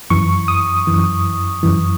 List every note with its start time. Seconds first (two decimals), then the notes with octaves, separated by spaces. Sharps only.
0.10 F#2 E3 C#6
0.48 D#6
0.87 F#2 E3
1.63 F#2 E3